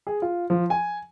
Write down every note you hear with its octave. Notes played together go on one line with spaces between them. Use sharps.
G#4
F4
F3
G#5